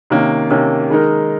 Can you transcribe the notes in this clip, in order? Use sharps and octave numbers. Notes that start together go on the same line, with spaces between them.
C3 D#3 A#3 C#4
C3 D#3 A#3 C#4
D#3 G#3 D#4 A#4